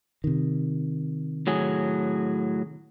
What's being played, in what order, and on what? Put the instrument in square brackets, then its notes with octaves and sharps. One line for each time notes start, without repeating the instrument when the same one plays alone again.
[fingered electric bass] C3 D#3
[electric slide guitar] A2 F#3 G#4